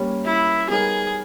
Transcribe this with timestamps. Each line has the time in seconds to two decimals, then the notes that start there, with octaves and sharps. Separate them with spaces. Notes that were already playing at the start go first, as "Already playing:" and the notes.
Already playing: G3 A#3 C#4 G4 C#5
0.25 E4
0.70 G3 B3 D#4 G#4 A#4 C#5